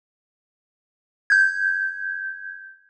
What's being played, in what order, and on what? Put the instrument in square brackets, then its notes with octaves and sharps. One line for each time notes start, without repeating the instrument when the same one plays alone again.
[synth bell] G6 G#6